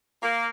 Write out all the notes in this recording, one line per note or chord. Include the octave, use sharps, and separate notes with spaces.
A#3